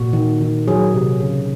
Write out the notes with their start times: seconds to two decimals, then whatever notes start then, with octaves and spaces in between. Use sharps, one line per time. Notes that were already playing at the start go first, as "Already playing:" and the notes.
Already playing: A#2 F#4
0.13 D#3
0.41 D#3
0.68 F#3 G#4
0.94 C3
1.20 C#3